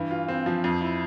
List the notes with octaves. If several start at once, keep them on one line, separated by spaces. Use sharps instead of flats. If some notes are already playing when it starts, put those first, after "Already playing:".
Already playing: G2 E3
F4
C4
F3
F2
E4